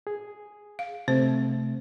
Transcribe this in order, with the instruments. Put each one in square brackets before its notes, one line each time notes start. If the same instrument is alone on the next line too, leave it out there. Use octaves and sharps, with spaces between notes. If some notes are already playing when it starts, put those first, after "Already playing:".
[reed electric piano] G#4
[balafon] F5
[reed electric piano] C3 A3 [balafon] C4 C5